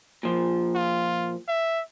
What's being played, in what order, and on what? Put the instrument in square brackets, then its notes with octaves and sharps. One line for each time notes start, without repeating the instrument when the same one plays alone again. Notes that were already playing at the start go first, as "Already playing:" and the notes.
[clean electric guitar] A#2 F3
[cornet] F4
E5